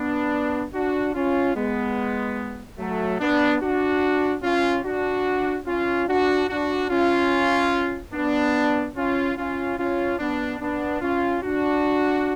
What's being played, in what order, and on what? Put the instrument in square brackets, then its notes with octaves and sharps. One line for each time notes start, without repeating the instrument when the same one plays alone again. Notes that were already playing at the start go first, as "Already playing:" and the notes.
Already playing: [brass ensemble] B3 D4
D4 F#4
C#4 F4
G#3 B3
F#3 A3
B3 D4
D4 F#4
C#4 F4
D4 F#4
C#4 F4
D4 F#4
D4 F#4
C#4 F4
B3 D4
C#4 F4
C#4 F4
C#4 F4
B3 D4
B3 D4
C#4 F4
D4 F#4